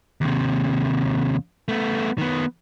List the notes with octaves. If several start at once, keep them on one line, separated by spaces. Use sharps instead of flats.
D#2 C3
A3 B3
D#3 B3